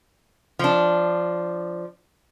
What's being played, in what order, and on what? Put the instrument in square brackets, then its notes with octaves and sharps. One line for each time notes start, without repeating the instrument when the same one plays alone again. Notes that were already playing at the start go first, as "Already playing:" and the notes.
[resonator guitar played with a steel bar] F3 D4